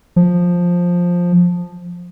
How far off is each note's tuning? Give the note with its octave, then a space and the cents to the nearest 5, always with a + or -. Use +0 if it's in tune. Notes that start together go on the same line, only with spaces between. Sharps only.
F3 +10